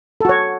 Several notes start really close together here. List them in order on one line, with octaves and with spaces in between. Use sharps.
A4 F#4 C#5